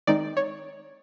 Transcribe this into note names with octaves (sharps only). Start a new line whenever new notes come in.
D#3 G#3 C4 D#4 D5
C#5